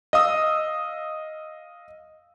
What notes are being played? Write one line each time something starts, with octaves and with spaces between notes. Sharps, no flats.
D#5 F5 D#6 E6